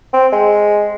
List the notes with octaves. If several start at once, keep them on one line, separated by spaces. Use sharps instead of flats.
C4
G#3